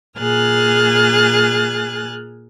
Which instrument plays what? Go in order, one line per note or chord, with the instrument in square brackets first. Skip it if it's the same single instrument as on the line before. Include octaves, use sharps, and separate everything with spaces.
[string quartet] A#2 G#4 G#5 F6 F#6 A6